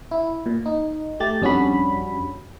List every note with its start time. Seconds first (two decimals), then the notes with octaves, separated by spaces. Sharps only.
0.11 E4
0.46 A#2
0.66 D#4
1.20 A3 G4 A6
1.42 F2 G3 C#4 D4 F#4 B5